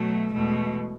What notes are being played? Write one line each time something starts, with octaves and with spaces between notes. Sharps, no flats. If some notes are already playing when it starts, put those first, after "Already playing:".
Already playing: B2 F#3 A3
E2 B2 G#3 A3